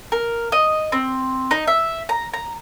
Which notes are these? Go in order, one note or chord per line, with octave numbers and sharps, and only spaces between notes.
A#4
D#5
C4
D#4
E5
A#5
A#5